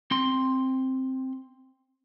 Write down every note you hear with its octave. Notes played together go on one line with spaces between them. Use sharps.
C4 C6